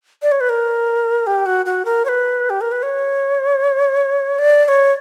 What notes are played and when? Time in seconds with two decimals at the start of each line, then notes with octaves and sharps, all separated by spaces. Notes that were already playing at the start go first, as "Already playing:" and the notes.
0.22 D5
0.32 C#5
0.40 B4
0.49 A#4
1.27 G4
1.46 F#4
1.66 F#4
1.85 A#4
2.05 C#5
2.09 B4
2.50 G4
2.61 A#4
2.72 B4
2.83 C#5
4.39 D5
4.65 D5
4.68 C#5